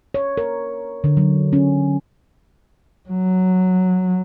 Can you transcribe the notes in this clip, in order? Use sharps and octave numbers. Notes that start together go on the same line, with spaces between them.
C#5
A#4
D3
F#3
C#4
F#3